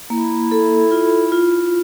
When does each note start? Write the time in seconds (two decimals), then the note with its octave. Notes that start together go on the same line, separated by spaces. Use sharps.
0.10 A#3 E4
0.52 A4
0.92 F4
1.32 F4